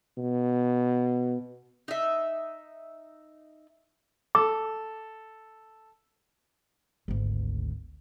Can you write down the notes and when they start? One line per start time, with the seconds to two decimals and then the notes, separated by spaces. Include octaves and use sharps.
0.17 B2
1.88 D#4 E5
4.35 A4 D6
7.08 G#1 D2